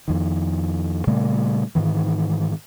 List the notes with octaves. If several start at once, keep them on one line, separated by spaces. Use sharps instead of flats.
F2 D#3
A#2 C#3 G3 A3
G#2 D#3 E3